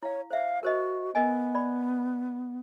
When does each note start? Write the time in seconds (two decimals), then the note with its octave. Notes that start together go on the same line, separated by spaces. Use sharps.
0.03 E4 C#5 F5
0.31 C5 E5 F5
0.63 F#4 A#4 C5 D#5
1.15 B3 A#4 D#5 G#5
1.55 D5 B5